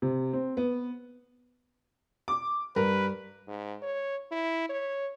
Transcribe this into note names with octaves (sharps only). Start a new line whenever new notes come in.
C3
C4
B3
D6
G2 A#4 B4
G#2
C#5
E4
C#5